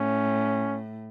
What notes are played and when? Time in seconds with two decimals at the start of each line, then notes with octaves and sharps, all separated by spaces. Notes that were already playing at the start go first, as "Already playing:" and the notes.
Already playing: A2 C#4